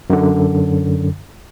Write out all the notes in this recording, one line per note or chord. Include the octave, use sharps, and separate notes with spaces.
F#2 D3